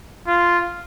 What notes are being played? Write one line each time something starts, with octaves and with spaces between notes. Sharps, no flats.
F4